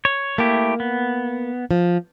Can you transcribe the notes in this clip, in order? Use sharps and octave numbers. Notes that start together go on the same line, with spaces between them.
C#5
A3 A#3 E4 G4
B3
F3